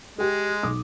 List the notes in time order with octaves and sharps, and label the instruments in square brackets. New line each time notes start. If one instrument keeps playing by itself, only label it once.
[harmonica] G#3 [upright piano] G4 G#4
[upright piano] B1 D6 D#6